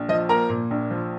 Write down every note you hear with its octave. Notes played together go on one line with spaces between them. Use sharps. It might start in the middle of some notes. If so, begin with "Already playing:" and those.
Already playing: A#1
F3 D#5
A#3 A#4 A#5
A#2
A#1
F3